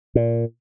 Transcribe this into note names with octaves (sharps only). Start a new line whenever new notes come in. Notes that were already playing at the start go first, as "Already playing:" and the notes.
A#2